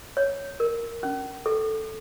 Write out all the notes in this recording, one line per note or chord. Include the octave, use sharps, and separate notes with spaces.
C#5
A#4
C#4
A4